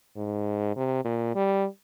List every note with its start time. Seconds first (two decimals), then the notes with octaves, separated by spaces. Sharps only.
0.17 G#2
0.76 C3
1.05 A#2
1.35 G3